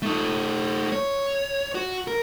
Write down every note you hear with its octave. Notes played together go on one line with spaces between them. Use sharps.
A3 D#4
C#5
F#4
A#4